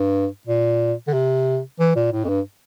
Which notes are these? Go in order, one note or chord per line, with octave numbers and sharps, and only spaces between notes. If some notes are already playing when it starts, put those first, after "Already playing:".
Already playing: G2
A#2
D3
C3
E3
A#2
A2
F2
G2